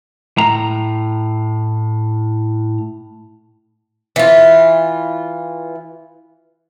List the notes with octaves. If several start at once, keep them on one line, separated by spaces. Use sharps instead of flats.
A2 A#5
E3 F4